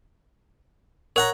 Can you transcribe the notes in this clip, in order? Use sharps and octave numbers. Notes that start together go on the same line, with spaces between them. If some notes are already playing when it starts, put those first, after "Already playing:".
A#4 C#5 F#5 A#5